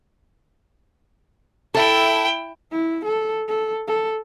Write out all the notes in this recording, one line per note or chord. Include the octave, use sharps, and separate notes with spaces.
E4 A4 E5 G5
E4
A4
A4
A4